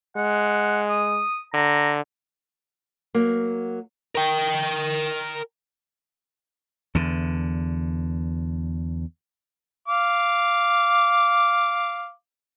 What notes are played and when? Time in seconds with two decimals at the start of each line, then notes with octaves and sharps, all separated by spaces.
0.16 G#3 F#5
0.90 D#6
1.54 D3 A#5
3.15 F#3 A#3
4.15 A#4 G5
6.95 E2 D3
9.88 F5 D6